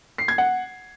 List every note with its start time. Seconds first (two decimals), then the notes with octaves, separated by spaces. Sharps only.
0.18 C7
0.28 G#6
0.38 F#5